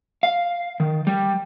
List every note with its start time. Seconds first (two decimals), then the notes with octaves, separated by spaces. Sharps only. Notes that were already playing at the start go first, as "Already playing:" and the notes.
0.23 F5
0.80 D#3
1.07 G3